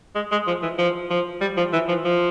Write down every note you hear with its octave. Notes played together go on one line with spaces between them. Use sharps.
G#3
G#3
F3
E3
F3
F3
G3
F3
E3
F3
F3